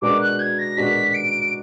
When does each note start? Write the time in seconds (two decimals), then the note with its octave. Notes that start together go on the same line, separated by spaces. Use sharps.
0.02 B2 G#3 D4 F#4 A#4 D6
0.20 F#6
0.39 G#6
0.59 A#6
0.77 B2 G#3 D4 F#4 A#4 B6
1.14 D7